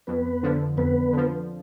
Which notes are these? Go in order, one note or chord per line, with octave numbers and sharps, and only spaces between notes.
F2 B3 B4
D3 F3
F2 B3 B4
D3 F3